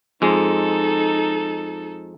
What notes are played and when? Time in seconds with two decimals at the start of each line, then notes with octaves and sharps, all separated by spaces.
0.22 F2 G#3 D#4 A4